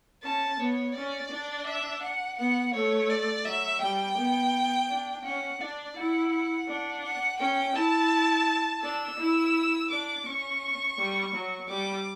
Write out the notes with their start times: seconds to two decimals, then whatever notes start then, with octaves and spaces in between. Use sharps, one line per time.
0.23 C#4 A5
0.59 B3 C#5
0.95 C#4 D5
1.31 D4
1.66 E5
2.02 F#5
2.38 B3 F#5
2.74 A3 C#5
3.10 D5
3.45 F#3 E5
3.81 G3 G5
4.17 B3
4.89 D4
5.25 C#4 F#5
5.61 D4 D5
5.96 E4 F#5
6.32 F#5
6.68 D4
7.04 F#5
7.40 C#4 G5
7.75 E4 A5
8.83 D4 E6
9.19 E4
9.90 D4 D6
10.26 C#4 C#6
10.98 G3
11.34 F#3
11.69 G3 D6